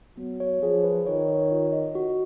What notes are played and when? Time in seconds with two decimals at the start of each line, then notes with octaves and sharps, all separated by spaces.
0.17 F#3 B3
0.40 C#5
0.62 F3 G#4
0.84 B4
1.07 D#3 C#5
1.29 C#5
1.51 F4
1.72 D#5
1.95 F#4